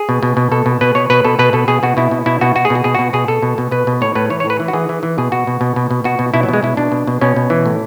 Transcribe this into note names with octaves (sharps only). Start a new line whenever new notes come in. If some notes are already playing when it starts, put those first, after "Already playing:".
Already playing: G#4
B2
B2
B2
B2 A4
B2
B2 B4
B2 C#5
B2 B4
B2 A4
B2 B4
B2 A4
B2 G#4
B2 F#4
B2 E4
B2
B2 E4
B2 F#4
B2 F#4
G#4
B2
F#4
B2 G#4
B2 F#4
B2 G#4
B2 A4
B2
B2
B2 B4
B2
A2 C#5
A2 B4
E3 C#5
C#5
A2 B4
E3
F#4
E3 G#4
E3
E3
B2 G#4
B2 F#4
B2
B2
B2
B2
B2 F#4
B2
B2 E4
F#3
B2 G#3
B2 E4
B2 D4
B2
B2
B2 C#4
B2
E3
A2